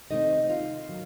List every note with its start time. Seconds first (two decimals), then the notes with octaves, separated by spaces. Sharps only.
0.11 C3 D#3 A3 C4 D#4 D#5
0.49 F4 F5
0.89 D#3 F#3